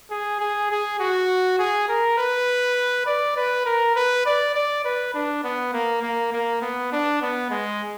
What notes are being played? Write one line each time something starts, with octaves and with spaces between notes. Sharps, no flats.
G#4
G#4
G#4
F#4
G#4
A#4
B4
D5
B4
A#4
B4
D5
D5
B4
D4
B3
A#3
A#3
A#3
B3
D4
B3
G#3